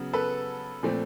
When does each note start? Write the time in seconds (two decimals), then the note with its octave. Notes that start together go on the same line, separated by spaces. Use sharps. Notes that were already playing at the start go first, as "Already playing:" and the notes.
Already playing: C#3 F#3 B3
0.13 A4 B4
0.83 A#2 F3 A3 C4